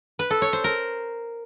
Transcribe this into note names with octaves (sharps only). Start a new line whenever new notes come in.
B4
A4
C#5
C5
A#4